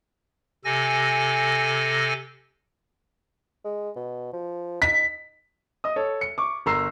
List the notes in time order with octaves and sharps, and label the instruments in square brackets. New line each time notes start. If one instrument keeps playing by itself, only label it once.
[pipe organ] C3 A4 G#5 A#6
[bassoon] G#3
B2
F3
[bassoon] D#4 [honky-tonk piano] B6
[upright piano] D#5 D#6
A4 C#5
C#7
C#6 D6
G1 A#4 A#5 C6 E6 C7